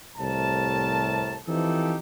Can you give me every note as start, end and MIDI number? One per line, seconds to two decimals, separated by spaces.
0.18 1.38 36
0.18 1.38 45
0.18 1.38 48
0.18 1.38 70
0.18 1.38 81
1.48 1.97 52
1.48 1.97 53
1.48 1.97 60
1.48 1.97 63
1.48 1.97 67
1.48 1.97 69